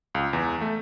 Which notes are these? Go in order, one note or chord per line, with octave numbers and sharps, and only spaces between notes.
C#2
E2
A3